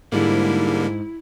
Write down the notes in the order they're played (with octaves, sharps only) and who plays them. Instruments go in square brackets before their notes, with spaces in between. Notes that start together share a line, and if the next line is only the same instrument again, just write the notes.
[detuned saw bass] G#2 [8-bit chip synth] D3 G3 A#3 [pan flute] E4